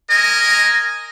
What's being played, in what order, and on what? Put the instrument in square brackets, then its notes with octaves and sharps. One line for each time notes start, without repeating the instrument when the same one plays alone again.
[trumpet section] A#4 D#5 G#5